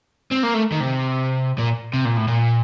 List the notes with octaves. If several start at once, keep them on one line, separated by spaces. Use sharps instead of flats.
C4
A#3
A3
D#3
C3
A#2
C3
A#2
A2
A#2